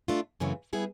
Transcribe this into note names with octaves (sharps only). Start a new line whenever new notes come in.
A3 D4 F4
F#2 C#3 E3 A3 C4
G3 B3 E4 G#4